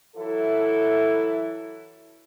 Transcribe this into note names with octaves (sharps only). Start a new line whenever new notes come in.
E3 F#3 E4 A4